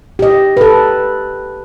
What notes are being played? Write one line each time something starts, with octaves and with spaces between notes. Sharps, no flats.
G4 D#5
A4 B4